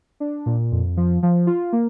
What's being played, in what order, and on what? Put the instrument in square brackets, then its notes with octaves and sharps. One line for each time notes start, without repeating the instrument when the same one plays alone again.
[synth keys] D4
A#2
F2
F3
F3
F4
A#3